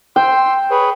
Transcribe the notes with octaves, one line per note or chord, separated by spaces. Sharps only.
G5 C6 E6
G#4 B4 C#5